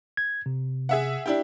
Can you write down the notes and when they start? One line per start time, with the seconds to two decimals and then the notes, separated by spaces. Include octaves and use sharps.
0.17 G#6
0.46 C3
0.89 G#4 E5 F#5
1.26 D4 E4 G4